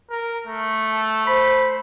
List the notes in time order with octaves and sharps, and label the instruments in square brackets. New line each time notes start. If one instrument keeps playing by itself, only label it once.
[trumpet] A#4
A3
[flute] A5
[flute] C5 [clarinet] B5